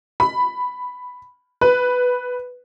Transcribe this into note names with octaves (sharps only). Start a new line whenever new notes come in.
B5
B4